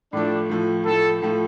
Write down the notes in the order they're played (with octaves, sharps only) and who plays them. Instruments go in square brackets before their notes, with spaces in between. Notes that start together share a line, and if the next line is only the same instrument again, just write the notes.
[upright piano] A2 F3 A3 [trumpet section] D4
[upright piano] A2 F3 A3
[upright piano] A2 F3 A3 [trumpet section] A4
[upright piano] A2 F3 A3